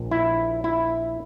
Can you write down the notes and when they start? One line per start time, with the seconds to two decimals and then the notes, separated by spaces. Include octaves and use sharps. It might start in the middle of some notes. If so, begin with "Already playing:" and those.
Already playing: A#1 A#2
0.11 E4
0.64 E4